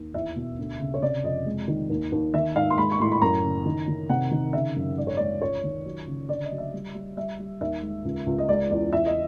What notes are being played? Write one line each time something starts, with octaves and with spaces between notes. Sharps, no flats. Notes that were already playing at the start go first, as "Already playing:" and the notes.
Already playing: D#2
E2 E5
B2
D2
C#3
C#5
C3 D5
F2 D#5
G#3
D#3
D#2
D#2
D#3 E5
G#2 F5
C6
G#3 B5
C#6
A2 C6
B5
F#2 A#5
C#3
D#3
D#3
C3 F#5
D#3
C#3 E5
F#2
G#2 D5
C#5
G#3 D5
C#2 C#5
D#3
F#3
C#3
D3 D5
D#5
F#3
E5
G3
G3
G3 E5
G3
D#2 E5
G#3
C#2
C#2
D#5
G#3 D5
E2 D5
E2 E5
D#5